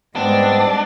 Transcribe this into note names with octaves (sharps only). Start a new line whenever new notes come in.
G#2 G3 G#3 B3 C4 D4